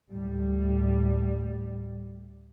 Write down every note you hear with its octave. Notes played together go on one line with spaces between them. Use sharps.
D2 A2 G3